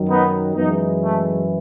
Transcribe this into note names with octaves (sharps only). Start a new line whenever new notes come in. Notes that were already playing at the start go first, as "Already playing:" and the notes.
Already playing: F#2 D#3 F#3
B3 D#4
F#2 E3 G#3 B3 D#4
A3